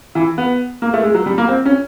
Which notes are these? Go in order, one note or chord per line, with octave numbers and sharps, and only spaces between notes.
E3
B3
A#3
A3
G#3
F#3
G3
A#3
C4
C#4